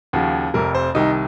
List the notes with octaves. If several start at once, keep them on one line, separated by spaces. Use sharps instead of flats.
D#2 C#3 F3 F#4
F1 F2 C3 A#4
C5
C2 C3 D#3 D#4